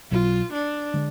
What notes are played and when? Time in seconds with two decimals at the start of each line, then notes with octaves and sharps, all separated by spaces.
0.11 B1 B2 F#3 F4
0.53 D4
0.94 D3 G#3 D4